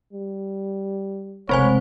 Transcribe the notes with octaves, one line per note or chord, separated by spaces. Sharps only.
G3
F1 C#2 G#3 C4 C5 C#5 G#5